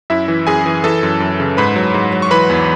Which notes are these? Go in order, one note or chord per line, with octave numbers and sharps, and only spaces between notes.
F#2 E4 E5
E3
F#2 G#4 G#5
E3
E3 A4 A5
F#2
F#2
C#3
G#2 B4 B5
F#3
G#2
F#3
C#6
E3 B4 B5
E2